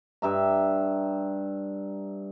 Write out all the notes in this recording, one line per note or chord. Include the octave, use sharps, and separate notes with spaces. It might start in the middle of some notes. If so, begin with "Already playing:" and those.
G2 E5 A#5